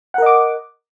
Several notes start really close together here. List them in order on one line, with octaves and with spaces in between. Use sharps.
F#5 A#4 D#5 D6